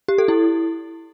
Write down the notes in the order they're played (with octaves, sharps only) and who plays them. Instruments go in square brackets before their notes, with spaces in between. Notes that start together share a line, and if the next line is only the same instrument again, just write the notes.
[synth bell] G4
A4
E4